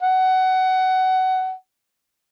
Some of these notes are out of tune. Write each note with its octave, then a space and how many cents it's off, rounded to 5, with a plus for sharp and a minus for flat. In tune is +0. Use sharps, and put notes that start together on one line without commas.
F#5 +20